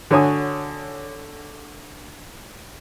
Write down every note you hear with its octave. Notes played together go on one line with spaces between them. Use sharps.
D3 F#4 C#5 G#5 D#6